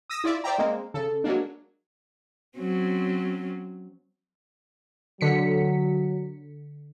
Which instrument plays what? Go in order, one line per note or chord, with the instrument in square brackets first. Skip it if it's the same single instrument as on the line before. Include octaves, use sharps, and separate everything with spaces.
[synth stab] D#6 E6 A#6
E4 F4 D5 E5
C5 D5 E5 G5 A#5
G#3 A#3 C4
C#3 A4
F#3 G#3 A#3 D4
[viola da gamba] F#3 C4 C#4
[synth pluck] D3 B6 C#7 [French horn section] F#3